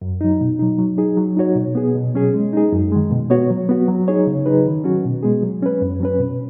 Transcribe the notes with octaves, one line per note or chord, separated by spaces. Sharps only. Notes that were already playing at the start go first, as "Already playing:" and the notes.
F#2
F#3 D#4
B2
F#3 D#4
F#3
D#4 G#4
F#3
D#4 F#4 C#5
B2
B3 G#4
B2
F#3 C#4 G#4
G#3
D#4 G#4
F#2
D#3 G#3
B2
B3 F#4 C#5
F#3
B3 F#4
F#3
D#4 G#4 C#5
C#3
F#3 D#4 G#4 B4
D#3
F#3 C#4 F#4
B2
G#3 B3 G#4
F#3
C#4 B4
F#2
F#3 C#4 B4
B2